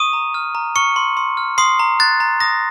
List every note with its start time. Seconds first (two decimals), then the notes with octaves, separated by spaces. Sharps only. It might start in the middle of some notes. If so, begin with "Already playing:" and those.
Already playing: C#6 D#6 D#7
0.13 A#5
0.34 F6
0.55 A#5
0.76 C#6 F6 C#7
0.96 C6
1.17 C6
1.37 F6
1.58 C6 D#6 C7
1.79 A#5
2.00 F#6 A6
2.20 A#5
2.40 D#6 A#6